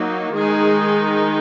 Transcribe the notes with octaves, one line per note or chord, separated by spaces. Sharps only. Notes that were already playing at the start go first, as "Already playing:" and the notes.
Already playing: F#3 A#3 D#4
D#3 G#3 D#4 G#4